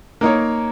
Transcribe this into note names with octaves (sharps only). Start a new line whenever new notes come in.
A#3 D#4 A#4 C#5